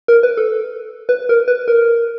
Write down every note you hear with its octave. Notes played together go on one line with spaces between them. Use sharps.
A#4
B4
A4
B4
A#4
B4
A#4